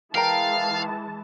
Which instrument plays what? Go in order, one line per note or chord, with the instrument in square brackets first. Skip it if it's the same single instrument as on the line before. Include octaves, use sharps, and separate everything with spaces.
[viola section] E3 G#3 A5 [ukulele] A#4 G5 A#5 [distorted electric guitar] F5